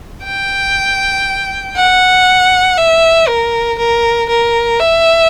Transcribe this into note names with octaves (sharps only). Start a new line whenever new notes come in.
G5
F#5
E5
A#4
A#4
A#4
E5